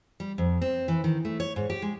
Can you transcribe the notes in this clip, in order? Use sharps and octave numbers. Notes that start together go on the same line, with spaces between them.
G3
F2
C4
E3
D#3
A3
C#5
G#2
G4
G#3